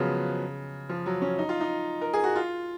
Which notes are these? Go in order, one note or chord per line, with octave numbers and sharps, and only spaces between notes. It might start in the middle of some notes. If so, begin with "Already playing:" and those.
Already playing: C#3 F3 F#3 G#3 B3
F3
F#3
C#4
D#4
F4
D#4
A#4
G#4
F#4
F4